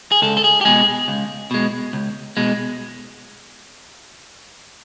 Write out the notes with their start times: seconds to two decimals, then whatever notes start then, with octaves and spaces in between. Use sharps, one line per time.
0.12 G#4
0.22 C#2 A4
0.37 A4
0.44 G#4
0.61 G4
0.65 B2 G#3 G#4
1.08 C#2
1.51 B2 G#3
1.93 C#2
2.37 B2 G#3